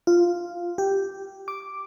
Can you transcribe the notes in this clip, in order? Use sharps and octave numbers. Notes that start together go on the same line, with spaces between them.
F4
G4
D6